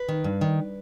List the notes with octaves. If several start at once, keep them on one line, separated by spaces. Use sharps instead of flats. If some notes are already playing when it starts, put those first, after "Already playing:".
Already playing: B4
D#3
G2
D#3